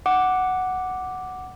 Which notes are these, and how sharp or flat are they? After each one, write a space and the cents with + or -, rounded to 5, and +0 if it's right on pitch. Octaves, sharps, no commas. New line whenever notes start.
F#5 +0 D6 +0